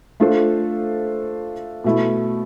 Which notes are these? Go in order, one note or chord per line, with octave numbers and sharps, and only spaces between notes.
A3 D4 F4 A4 C5
B2 A3 E4